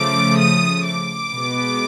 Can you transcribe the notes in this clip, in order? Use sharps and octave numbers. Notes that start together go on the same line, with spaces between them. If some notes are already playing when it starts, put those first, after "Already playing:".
Already playing: C#3 F3 A3 D6
D#6
D6
B2 G#3 B3